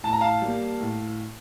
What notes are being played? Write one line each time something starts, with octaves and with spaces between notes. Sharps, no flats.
A2 A5
A#5
F5 A5
G3 A#3
A2